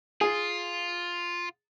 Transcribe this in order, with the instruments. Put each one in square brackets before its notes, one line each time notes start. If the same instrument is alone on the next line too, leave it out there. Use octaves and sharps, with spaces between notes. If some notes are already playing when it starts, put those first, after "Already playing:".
[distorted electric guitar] F4 [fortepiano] G#4